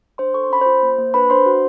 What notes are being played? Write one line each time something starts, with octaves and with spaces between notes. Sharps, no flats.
D4 C5 C6
A4 C#6
C6
C#4 B5
F4 C5 C6
A#3
A#3
D4 B4 B5
D4 C5 C6
F#4